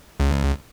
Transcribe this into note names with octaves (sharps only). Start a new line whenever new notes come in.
C#2